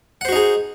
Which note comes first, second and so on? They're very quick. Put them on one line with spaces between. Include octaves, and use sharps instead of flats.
F#5 C5 F#4 D#4 G#4